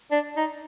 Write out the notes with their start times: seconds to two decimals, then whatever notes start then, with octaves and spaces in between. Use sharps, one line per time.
0.12 D4
0.37 D#4